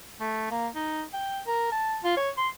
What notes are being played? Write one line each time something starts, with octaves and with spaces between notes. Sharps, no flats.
A3
A#3
D#4
G5
A#4
A5
F4
C#5
C6